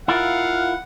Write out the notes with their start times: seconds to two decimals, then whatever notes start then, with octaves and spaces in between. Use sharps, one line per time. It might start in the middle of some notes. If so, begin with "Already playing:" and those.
0.08 E4 F4 A#4 F5 F#5